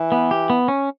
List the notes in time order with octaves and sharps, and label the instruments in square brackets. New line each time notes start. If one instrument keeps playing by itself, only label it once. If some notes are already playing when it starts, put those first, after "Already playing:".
Already playing: [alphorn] E3
[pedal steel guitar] B3
G4
B3
C#4